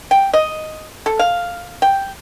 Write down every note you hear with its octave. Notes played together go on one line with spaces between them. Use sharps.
G5
D#5
A4
F5
G5